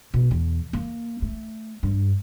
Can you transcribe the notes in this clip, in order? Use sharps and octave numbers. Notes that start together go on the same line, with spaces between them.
B2
E2
A#3
A3
G2